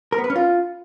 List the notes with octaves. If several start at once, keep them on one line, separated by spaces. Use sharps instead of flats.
A#4
B3
B4
C#4
F4